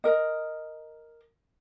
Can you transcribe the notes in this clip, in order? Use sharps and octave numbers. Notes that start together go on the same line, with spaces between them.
A#4 D#5